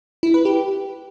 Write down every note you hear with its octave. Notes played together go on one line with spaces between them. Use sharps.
E4
B4
G4